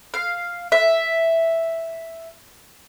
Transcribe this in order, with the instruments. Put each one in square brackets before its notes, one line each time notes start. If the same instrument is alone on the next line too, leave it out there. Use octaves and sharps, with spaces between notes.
[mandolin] F5
E5